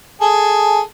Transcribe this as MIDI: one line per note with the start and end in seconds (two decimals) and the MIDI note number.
0.21 0.81 68
0.21 0.81 69